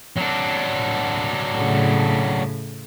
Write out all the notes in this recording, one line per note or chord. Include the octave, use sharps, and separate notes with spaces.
F#3 D4
A2 C#3